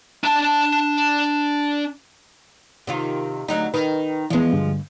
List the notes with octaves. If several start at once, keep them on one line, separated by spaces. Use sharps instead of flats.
D4 A5
C3 D#3 F4
D2 F#3 D#4
D#3 B4
E3 F3 G#3 B3
G2 D3